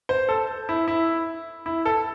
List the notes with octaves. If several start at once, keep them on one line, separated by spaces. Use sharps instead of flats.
C5
A4
E4
E4
E4
A4